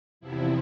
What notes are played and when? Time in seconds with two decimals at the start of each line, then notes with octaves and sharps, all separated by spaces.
0.20 E2 C3 F3 E4